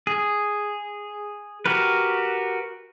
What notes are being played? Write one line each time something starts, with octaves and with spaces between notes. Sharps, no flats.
G#4
F#4 G4 A#4 B4